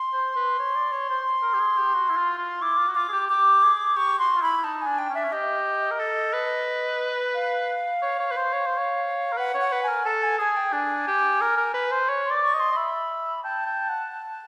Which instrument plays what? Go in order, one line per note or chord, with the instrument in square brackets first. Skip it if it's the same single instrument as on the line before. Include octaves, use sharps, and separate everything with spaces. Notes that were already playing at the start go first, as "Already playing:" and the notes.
Already playing: [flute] C6
[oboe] C5
B4
C#5
D5
C#5
C5
A#4
G4
G#4
G4
F#4
E4
F4
F4
[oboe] E4 [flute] D6
[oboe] F4
F#4
[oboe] F4 [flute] D6
[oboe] G#4
G4
[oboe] G4 [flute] D6
[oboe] G#4
[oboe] G4 [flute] C#6
[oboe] F#4 [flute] C6
[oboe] F4
[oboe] E4 [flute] B5
[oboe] E4
[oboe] D#4 [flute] A5
[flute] G#5
[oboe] D4
[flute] G5
[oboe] C#4
[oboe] D4 [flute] E5
[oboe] C#4
[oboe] G4 [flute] D#5
[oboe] A#4
A4
B4
[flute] F5
[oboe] C#5
C#5
B4
C5
C#5
C5
C#5
A#4
[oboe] B4 [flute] F#5
[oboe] C#5
[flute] F#5
[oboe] B4
[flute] G#5
[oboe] A#4
[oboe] A4 [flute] A5
[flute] G#5
[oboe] G#4 [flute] G#5
[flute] G5
[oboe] D4 [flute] G#5
[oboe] G4
A#4
A#4
B4
C5
C#5
[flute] C6
[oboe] D5 [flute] D6
[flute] C#6
[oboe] D#5
[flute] C6
[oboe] D#5
[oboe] E5 [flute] B5
[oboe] G5 [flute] A5
[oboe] G5
F#5